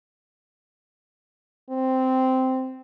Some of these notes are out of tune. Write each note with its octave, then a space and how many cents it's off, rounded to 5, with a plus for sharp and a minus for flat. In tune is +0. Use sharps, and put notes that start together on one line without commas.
C4 -10